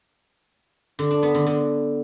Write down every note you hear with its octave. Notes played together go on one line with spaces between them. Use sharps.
D3
D4
B3
D3
D3